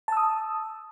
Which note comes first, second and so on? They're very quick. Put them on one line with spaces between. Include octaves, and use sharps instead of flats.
A5 E6 D#6